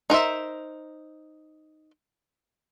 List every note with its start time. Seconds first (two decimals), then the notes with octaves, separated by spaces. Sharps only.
0.10 D#4 A#4 C5 E5